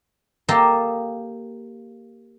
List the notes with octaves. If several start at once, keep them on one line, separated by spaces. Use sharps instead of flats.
A#3 G4 A4 D#5 A5